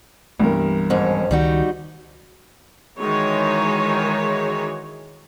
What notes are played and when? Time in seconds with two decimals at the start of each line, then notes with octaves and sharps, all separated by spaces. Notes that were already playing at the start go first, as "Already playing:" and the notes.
0.40 C2 G2 E3 G3 B3 A#4
0.90 F2 G#2 C#4
1.31 C#2 D#3 G3 D#4 F#4
2.99 D#3 E3 G#3 F#4 C#5